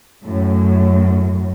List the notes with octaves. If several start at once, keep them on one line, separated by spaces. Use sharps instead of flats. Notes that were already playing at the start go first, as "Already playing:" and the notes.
F#2 A2